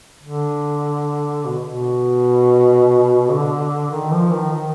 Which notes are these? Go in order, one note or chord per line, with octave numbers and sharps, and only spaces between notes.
D3
B2
B2
D3
D#3
F3
D#3
D#3